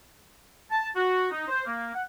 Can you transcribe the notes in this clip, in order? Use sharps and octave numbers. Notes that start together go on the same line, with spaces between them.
A5
F#4
D#4
C5
A#3
F#5